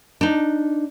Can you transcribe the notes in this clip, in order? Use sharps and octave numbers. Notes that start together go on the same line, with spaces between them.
D4 D#4